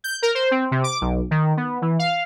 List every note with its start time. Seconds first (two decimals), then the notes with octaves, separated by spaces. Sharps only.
0.04 G6
0.22 A#4
0.35 C5
0.51 C4
0.71 C3
0.84 D6
1.01 B1
1.31 D#3
1.57 B3
1.82 E3
1.99 F5